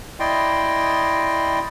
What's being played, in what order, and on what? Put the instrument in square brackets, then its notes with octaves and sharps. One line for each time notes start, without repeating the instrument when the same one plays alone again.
[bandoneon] E4 D5 D#5 G5 C6